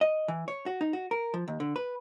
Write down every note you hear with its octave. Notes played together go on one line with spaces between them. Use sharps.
D#5
E3
C#5
F#4
D#4
F#4
A#4
F3
D#2
D3
B4